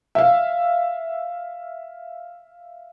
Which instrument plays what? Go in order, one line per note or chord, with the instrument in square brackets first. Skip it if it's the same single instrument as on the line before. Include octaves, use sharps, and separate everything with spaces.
[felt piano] E5 F5